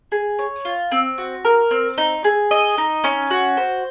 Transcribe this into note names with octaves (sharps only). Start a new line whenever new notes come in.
G#4
C#5
F4
C4
F#4
A#4
C4
D#4
G#4
D#5
D#4
C#4
F#4
C5